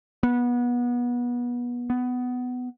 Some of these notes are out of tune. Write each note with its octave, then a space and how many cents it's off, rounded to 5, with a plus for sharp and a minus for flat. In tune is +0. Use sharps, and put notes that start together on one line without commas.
B3 -25
B3 +15